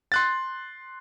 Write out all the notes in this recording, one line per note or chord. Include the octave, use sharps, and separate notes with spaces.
C6 F#6 A6